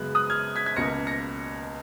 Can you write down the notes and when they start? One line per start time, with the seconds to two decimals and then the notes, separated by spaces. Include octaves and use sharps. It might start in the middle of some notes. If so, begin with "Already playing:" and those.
Already playing: F#2 C#3 G#3 B3 F#6
0.15 D#6 F#6
0.30 F6 G#6
0.56 G#6 B6
0.66 G#6 B6
0.76 C#2 B2 A#3 A#6 C#7
1.07 A#6 C#7